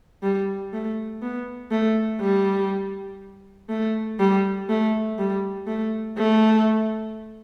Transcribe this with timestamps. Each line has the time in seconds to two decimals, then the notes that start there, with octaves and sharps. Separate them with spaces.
0.23 G3
0.73 A3
1.22 B3
1.71 A3
2.20 G3
3.69 A3
4.19 G3
4.69 A3
5.19 G3
5.67 A3
6.17 A3